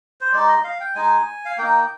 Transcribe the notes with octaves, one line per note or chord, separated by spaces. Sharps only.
C5
G#3 D#4 D5
D#5
F5
G5
G#3 D#4 G#5
F5
A#3 D#4 G5